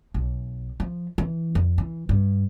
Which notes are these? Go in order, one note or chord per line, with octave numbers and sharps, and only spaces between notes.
B1
F3
E3
F2
E3
G2